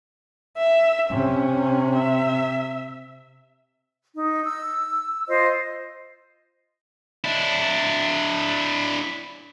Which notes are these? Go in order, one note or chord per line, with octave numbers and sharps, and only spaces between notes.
E5
C3 C#4
E5
D#4
E6
F4 C5 D#5
D4 E4